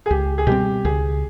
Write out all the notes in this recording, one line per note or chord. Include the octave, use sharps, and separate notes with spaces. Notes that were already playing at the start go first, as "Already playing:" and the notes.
G#4
C#2 G4
G#4
B2 G3 C4 G4
C#2 G#4